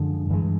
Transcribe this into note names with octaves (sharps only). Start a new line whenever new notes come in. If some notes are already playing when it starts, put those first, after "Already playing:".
Already playing: F#2 D3 F3 G#3
G2 E3 G#3